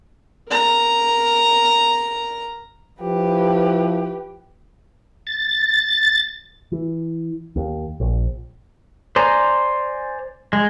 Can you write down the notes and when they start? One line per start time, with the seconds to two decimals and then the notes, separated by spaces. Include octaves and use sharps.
0.49 A#4 A#5
3.02 F3 E4 G4 B4
5.27 A6
6.72 E3
7.56 D#2
8.00 A#1
9.16 C5 D5 G#5 A#5
10.53 G#3